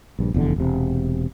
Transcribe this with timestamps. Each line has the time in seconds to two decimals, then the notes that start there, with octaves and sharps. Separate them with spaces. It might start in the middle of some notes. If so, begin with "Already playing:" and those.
0.19 A#1 G2
0.34 F1 E2 B2 D3
0.56 E1 C3